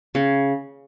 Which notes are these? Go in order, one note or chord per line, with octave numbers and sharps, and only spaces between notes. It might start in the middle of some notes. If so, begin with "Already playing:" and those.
C#3